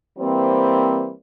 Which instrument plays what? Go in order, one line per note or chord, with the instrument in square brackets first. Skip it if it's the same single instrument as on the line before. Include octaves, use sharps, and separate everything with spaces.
[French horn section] E3 G3 A#3 C4